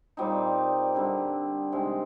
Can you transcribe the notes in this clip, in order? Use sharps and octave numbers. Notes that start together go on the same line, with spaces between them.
A#2 G3 C4 D#4
D3 G3 C4
C3 D#3 G#3